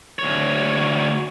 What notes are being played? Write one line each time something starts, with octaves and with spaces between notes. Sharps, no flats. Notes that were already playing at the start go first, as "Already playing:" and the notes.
D2 C#5